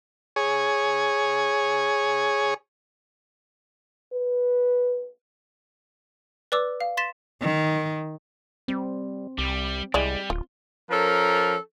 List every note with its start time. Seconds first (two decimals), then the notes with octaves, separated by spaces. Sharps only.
0.36 G#4 C#5
4.13 B4
6.52 B4 D5 D6 E6
6.80 F5
6.97 C6 A6 B6 E7
7.41 D#3
8.68 G3 C4
9.38 C2 G3
9.94 C2 G3 G#3 E4 D5
10.30 D1 F4
10.90 F3 C#4 A4 A#4